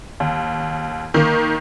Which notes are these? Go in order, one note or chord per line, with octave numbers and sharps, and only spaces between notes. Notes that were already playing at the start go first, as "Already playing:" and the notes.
D#2
D#3 A#3